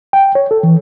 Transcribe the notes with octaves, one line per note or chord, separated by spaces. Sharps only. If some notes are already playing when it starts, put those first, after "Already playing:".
G5
C#5
A4
E3